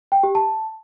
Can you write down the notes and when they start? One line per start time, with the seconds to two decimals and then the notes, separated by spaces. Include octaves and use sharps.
0.12 G5
0.23 G4
0.35 A5